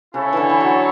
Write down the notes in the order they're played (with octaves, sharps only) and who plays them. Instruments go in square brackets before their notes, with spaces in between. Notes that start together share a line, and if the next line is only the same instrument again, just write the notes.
[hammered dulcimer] C#3 [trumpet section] E4 A4 C#5
[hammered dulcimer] D3 E3
E3
F#3